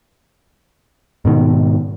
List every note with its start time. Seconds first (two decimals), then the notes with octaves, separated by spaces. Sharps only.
1.25 G#2 B2 D#3